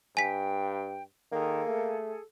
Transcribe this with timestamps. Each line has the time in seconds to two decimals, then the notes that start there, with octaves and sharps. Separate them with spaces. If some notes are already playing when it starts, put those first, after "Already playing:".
0.17 G2 G5 G#5 B6
1.32 D#3 A#3 G#4 A4
1.68 A3